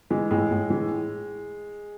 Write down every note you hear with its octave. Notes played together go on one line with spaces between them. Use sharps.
E3 G#3
A2 G#3
A2
E3